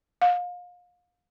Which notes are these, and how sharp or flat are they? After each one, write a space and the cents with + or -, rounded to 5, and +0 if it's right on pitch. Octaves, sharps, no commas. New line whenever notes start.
F5 +30